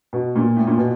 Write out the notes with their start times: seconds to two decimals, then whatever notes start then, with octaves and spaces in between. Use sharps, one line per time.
0.13 B2
0.36 A#2
0.56 A2
0.67 A#2
0.78 B2